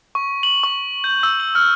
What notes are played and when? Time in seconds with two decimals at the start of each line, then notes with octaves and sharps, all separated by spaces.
0.15 C#6
0.43 F#7
0.63 C#6
1.04 G6
1.23 E6
1.40 F#7
1.55 F6